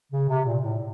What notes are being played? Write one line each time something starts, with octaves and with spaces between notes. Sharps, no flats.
C#3
C3
A#2
A2